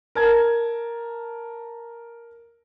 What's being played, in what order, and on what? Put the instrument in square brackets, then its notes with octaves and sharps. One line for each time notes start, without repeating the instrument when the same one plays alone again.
[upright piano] A#4 A5 G#6